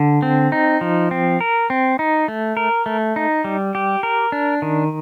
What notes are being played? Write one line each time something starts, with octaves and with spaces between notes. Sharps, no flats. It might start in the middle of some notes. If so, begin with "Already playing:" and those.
Already playing: D3
C4
D#4
F3
C4
A#4
C4
D#4
A3
A#4
A3
D#4
G3
G4
A#4
D4
D#3